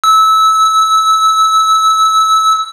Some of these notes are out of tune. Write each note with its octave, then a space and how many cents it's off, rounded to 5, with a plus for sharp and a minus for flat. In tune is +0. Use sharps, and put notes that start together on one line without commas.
E6 -20